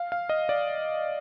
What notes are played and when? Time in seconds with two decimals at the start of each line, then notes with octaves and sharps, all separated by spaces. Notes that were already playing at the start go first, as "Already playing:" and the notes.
Already playing: F5
0.12 F5
0.29 D#5
0.49 D5